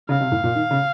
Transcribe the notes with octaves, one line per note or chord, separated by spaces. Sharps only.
C#3 F5
C3
A2
A#2
D#3
C#3